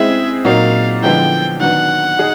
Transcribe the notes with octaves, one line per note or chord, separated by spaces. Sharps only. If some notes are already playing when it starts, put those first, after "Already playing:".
Already playing: G#3 C4 E4 G#4 E5
A#2 F#3 A#3 D#4 F#4 F5
D3 F3 G#3 B3 E4 G5
D#3 F#3 B3 D4 F#5
D#4 G#4